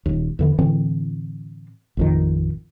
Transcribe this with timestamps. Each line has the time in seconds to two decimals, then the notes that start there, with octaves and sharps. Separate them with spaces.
0.06 D#1 D#2
0.39 E2 D3 E3
0.58 A2 D3 E3 C4
1.97 A1 F2 D#3